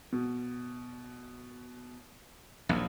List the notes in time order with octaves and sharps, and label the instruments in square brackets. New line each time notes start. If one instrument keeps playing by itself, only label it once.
[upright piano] B2
[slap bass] A#1 D#2